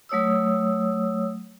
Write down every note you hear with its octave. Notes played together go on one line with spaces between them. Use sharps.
F#3 A3 C#5 D#6 E6